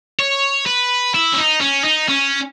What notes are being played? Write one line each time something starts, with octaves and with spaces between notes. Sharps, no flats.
C#5
B4
E4
C#4
D#4
C#4
D#4
C#4